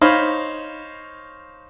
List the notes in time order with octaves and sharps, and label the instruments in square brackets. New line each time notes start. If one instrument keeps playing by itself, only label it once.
[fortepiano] D#4 C5 C#5 F5 B5